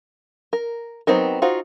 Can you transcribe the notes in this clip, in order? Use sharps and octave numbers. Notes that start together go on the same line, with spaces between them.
A#4
F#3 B3 C4 D#4 A#4
D#4 F4 F#4 C5